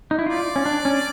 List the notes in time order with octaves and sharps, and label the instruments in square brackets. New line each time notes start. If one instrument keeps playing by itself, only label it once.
[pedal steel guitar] D#4
E4
[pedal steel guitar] F4 [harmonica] D5
[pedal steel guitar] C#4
D4
C#4